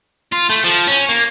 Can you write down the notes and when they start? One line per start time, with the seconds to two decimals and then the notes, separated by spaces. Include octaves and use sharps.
0.32 F4
0.49 A3
0.64 F3
0.87 C#4
1.09 A#3